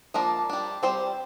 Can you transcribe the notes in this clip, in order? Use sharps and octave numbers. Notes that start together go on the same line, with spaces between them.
F3 A#3 D4 A#4
G3 D4
G3 C4 C5